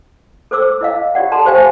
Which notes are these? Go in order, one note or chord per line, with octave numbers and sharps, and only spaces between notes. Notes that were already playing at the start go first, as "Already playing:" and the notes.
A4 C5 D6 E6
E4 D#5 F5
F4 G4 D5 F#5
A4 A5 A#5 C6
G4 C5 F5 G#5